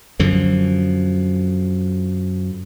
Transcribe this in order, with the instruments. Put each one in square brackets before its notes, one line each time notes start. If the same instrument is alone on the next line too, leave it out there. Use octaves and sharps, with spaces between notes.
[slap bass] F#2 D3 F3